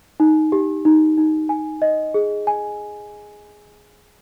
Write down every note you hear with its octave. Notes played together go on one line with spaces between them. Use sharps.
D#4
G4
D#4
D#4
G#5
D#5
G#4
G#5